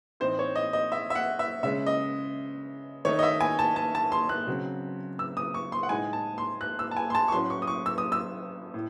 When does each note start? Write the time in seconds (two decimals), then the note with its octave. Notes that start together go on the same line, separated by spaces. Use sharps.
0.20 A2 E3 C4 D#4 C5
0.39 C#5
0.56 D#5
0.73 D#5
0.92 E5
1.10 E5
1.15 F#5
1.39 E5
1.63 C#3 G#3 C#4 E5
1.87 D#5
3.05 D#3 A3 D#4 C#5
3.19 D#5
3.23 E5
3.41 G#5
3.59 A5
3.76 A5
3.95 A5
4.12 C6
4.29 F#6
4.47 C#3 F#3 C4
5.19 E6
5.37 D#6
5.54 C#6
5.72 C6
5.83 F#5
5.89 A2 G#3 D#4 G#5
6.13 A5
6.38 C6
6.61 F#6
6.79 E6
6.91 A5
6.97 G#5
7.10 C6
7.15 A5
7.28 C#6
7.32 A2 F#3 C#4 C6
7.50 C#6
7.62 D#6
7.67 C#6
7.86 E6
7.98 D#6
8.12 E6
8.74 A2